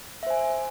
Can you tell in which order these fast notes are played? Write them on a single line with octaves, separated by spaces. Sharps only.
E5 C5 G#5